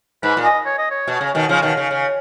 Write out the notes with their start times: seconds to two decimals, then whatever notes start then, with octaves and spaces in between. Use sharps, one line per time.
0.23 G#2 B4
0.37 A#2
0.44 D#5
0.65 C#5
0.78 D#5
0.91 C#5
1.08 B2
1.21 C#3
1.35 B2 D#3
1.49 C#3 F3 F5
1.62 B2 D#3
1.77 C#3
1.91 C#3